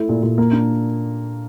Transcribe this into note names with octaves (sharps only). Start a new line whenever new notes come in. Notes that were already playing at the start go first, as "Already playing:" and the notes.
Already playing: A3 E4
A#2
A#2
A#3
D4